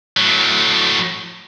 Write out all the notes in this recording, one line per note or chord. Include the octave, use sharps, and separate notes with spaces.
A2 F#3